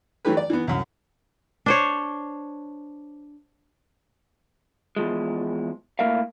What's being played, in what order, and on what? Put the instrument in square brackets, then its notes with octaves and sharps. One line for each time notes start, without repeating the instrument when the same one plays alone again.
[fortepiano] E3 F#3 A3 G4 B4
D5
E3 B3
C2 F#2
[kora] D4 C5 C#5
[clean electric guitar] E2 F3 G#3
A2 A#3 A#4 E5 F5